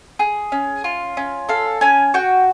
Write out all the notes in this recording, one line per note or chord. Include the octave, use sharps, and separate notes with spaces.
G#4
C#4
F4
C#4
A4 F5
C#4 G#5
F#4 G5